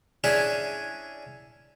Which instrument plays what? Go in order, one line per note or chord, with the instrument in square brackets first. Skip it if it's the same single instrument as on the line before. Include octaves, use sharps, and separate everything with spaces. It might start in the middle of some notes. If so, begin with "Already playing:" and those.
[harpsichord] C#4 D4 E4 G#4